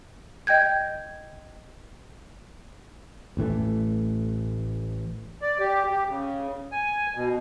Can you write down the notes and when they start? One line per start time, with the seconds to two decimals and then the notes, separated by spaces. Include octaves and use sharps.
0.47 D#5 G5 G6 G#6
3.37 A1 A2 E3 A3
5.42 D5
5.59 G4
5.90 G4
6.07 C#3
6.72 G#5
7.15 B2